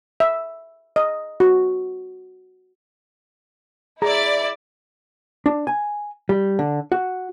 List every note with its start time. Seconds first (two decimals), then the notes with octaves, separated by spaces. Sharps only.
0.20 E5
0.96 D#5
1.40 F#4
4.02 E4 G#4 D5 A#5
5.46 D4
5.67 G#5
6.29 G3
6.59 D3
6.92 F#4